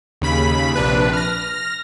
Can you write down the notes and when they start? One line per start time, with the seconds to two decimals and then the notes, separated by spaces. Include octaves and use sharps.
0.22 D#2 C#3 B5 B6
0.75 A#1 C3 D4 B4
1.13 F6 A#6